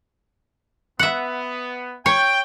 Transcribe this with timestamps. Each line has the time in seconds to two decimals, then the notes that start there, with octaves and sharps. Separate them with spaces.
0.99 B3 E5 F#5
2.06 C#5 G5